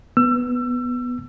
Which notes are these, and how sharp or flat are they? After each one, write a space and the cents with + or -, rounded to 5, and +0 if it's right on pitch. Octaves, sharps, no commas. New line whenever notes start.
B3 +0 E6 +30